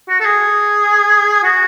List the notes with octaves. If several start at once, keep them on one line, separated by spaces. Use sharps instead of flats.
F#4
A4
G#4
F#4